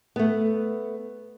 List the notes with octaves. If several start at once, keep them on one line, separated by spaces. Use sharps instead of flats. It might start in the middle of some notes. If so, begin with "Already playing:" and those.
A3 B3